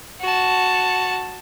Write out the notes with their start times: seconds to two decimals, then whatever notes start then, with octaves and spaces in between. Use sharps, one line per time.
0.21 F#4 A5